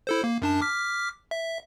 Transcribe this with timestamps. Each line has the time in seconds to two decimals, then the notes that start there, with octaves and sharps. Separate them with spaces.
0.07 E4 A4 C5
0.24 A#3
0.42 F#2 D4 A5
0.61 D6 F6 B6
1.31 E5